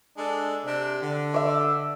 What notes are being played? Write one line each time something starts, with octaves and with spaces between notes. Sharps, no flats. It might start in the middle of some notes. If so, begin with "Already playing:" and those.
G#3 D4 A4
C3 D4
D3
D5 E5